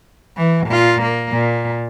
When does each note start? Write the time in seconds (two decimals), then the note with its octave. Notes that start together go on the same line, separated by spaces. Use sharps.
0.37 E3
0.67 A#2 F4
1.02 A#3
1.32 A#2